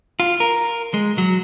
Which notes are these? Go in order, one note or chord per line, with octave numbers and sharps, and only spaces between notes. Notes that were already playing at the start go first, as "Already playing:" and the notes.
F4
A#4
G#3
F#3